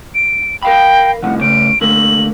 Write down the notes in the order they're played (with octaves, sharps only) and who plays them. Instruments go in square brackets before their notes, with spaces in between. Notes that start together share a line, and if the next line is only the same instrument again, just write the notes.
[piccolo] D7
[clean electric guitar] A#4 F5 B5 [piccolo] G5
[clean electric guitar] C2 F2 A2 [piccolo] F#5
[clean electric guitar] C#3 A3 C#4 [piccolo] D7
[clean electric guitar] D3 A3 A#3 [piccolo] F#7